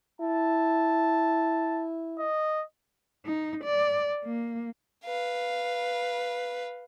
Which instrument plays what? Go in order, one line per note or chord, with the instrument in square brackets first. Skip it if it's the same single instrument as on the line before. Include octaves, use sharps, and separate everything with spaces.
[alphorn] E4 [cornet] A5
[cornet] D#5
[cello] D#4
D5
A#3
[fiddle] B4 F5